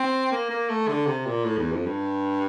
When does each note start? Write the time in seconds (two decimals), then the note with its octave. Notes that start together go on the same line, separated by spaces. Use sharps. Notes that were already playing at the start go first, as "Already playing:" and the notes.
Already playing: C4
0.32 A#3
0.50 A#3
0.69 A3
0.89 D3
1.07 C3
1.26 A#2
1.44 A2
1.58 E2
1.72 F2
1.86 G2